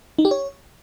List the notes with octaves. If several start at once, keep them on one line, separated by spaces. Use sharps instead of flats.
D#4
G4
C#5